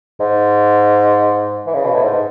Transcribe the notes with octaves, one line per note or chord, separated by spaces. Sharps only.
G#2
E3
C#3
B2
A2
G#2